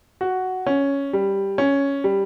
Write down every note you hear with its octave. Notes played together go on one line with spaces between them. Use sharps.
F#4
C#4
G3
C#4
G3